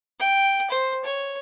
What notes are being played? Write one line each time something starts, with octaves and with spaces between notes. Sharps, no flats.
G5
C5
C#5